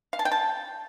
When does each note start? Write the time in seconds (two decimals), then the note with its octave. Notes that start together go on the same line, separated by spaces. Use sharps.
0.13 F5
0.19 A5
0.25 G5
0.32 A5